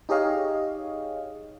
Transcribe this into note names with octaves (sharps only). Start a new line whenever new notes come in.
D#4 G4 G#4 C#5 D#5 F5